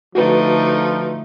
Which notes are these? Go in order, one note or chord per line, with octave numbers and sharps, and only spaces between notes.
D3 F3 A3 D#4 F#4 B4